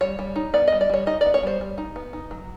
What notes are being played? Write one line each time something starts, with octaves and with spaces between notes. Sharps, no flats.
G3 C#5
G3
D#4
B3 D5
G3 D#5
D5
G3 C#5
D#4 D#5
B3 D5
C#5
G3 C5
G3
D#4
B3
D#4
F#3